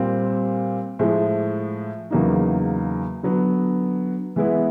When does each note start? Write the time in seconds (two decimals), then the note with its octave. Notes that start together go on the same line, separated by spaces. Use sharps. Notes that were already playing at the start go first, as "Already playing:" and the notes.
Already playing: A#2 G3 C4
0.99 A2 F3 G#3
2.11 E2 C#3 F#3 A#3 D#4
3.23 D3 F#3 B3
4.36 E3 G#3 B3 E4